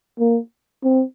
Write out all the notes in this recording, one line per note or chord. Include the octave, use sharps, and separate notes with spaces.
A#3
C4